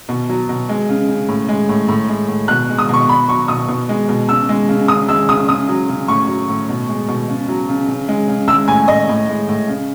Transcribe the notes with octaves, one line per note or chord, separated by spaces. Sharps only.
B2
F#3
B2
G#3
C#3
C#3
A2
G#3
A2
A2
G#3
A2
B2 F#6
G#3
D#6
B2 C#6
B2 B5
F#3 C#6
B2 D#6
B2
G#3
B2
C#3 E6
G#3
C#3
C#3 D#6
G#3 E6
C#3 D#6
C#3 D#6
F#3
C#3
A2 C#6
F#3
A2
B2
G#3
B2
C#3
F#3
C#3
C#3
G#3
C#3
G#3 E6
A2 G#5
A2 D#5
A2
G#3
A2
C#3